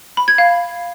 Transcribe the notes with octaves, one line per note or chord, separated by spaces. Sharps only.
B5
G#6
F5